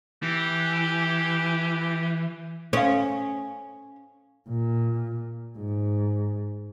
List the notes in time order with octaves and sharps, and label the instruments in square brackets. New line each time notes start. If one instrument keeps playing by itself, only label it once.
[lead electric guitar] E3 [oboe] G4
[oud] C#4 [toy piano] A4 F5
[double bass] A#2
G#2